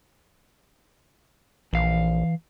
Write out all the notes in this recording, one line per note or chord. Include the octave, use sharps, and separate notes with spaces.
A#1 E3 F5